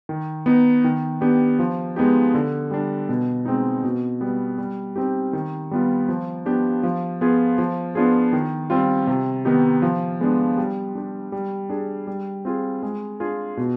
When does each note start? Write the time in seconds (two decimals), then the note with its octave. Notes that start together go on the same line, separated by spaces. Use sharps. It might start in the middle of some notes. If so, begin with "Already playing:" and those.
0.09 D#3
0.46 B3 D#4
0.84 D#3
1.21 B3 D4 G4
1.59 F3
1.96 G#3 B3 D#4 G4
2.34 D3
2.71 G3 D4
3.09 B2
3.45 G#3 C4 D#4
3.84 B2
4.21 G3 B3
4.58 G3
4.96 C4 D#4 G4
5.33 D#3
5.71 G3 B3 F4
6.09 F3
6.46 B3 D4 G4
6.83 F3
7.21 B3 F4 G#4
7.58 F3
7.95 B3 D4 F4 G#4
8.33 D#3
8.70 G3 C4 F4
9.07 C3
9.45 D#3 B3 D#4 G4
9.82 F3
10.21 G#3 B3 D4
10.58 G3
10.95 D4 G4
11.32 G3
11.70 D4 G#4
12.07 G3
12.45 C4 F4 G#4
12.83 G#3
13.20 D4 F4 G#4
13.57 B2